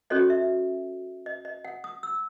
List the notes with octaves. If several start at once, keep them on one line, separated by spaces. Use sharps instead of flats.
C#4 F#4 A4 C#5 D#5
E5
D#5
D#5
F#5
D#6
E6